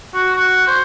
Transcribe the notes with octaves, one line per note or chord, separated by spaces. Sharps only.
F#4
F#4
C5